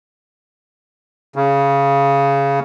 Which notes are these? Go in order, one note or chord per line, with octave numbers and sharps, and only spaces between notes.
C#3